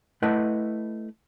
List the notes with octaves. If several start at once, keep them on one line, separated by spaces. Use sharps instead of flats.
A3 E4 B4 D#5 F#5